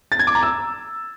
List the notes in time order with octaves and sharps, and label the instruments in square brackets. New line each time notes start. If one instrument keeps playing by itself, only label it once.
[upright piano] A6
G#6
D6
A#5
E6